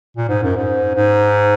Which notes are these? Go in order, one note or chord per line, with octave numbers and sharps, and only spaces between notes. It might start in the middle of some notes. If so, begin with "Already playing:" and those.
A#2
G#2
F#2
G#2
G#2